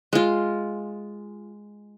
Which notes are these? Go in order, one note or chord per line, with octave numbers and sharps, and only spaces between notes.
G#3 F4